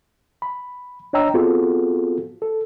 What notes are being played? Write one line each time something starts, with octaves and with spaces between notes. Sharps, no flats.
B5
D4 C#5 D#5 G5 A#5 E6
B3 C4 F4 F#4 G#4 A4
A4